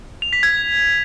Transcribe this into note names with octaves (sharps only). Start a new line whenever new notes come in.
F7
B6
G#6